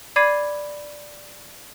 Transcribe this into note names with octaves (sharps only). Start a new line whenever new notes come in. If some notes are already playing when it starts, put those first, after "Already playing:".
D5 B5 D6 G#6 C7 D#7